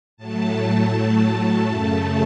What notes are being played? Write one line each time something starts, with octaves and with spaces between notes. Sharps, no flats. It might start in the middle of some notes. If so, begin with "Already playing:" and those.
A2 F#3 A3 A5
F#2 C#3 A3 A5